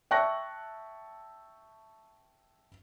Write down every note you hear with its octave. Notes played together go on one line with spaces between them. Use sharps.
E5 G5 A5 C#6 F#6 A#6